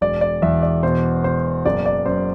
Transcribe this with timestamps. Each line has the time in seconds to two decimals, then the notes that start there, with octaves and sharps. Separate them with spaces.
0.01 E1 D5
0.21 D5
0.42 E2 E5
0.62 D5
0.83 B2 C5
1.24 B2 C5
1.65 F#1 D5
1.86 D5
2.06 F#2 C5